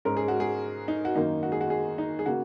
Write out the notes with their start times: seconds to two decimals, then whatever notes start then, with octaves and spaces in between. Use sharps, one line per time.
0.05 G#2 G#3 C#4 A#4
0.17 G#4
0.28 F#4
0.40 G#4
0.88 D#4
1.05 F#4
1.15 F#2 D#3 A#3 D#4
1.43 F#4
1.52 G#4
1.61 F#4
1.70 G#4
1.98 D#4
2.19 G#4
2.26 C#3 A#3 F#4